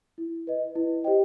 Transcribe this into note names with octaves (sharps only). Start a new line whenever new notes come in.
E4
B4 D#5
E4
G4 C5 D#5 G5